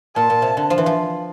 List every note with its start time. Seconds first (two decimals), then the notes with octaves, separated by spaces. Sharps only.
0.16 A#2 A5
0.30 A#2
0.42 C3
0.57 D3
0.70 F3
0.78 E3
0.86 F3